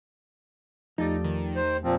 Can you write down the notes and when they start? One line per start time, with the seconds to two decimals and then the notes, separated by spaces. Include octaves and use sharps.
0.98 E2 F3 A3 D#4 G4 A4 D5
1.24 D#3
1.56 C5
1.84 A#2 F3 C4